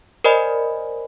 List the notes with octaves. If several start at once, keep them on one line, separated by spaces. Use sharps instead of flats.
A#4 C5 D5 D#5 G#5 B5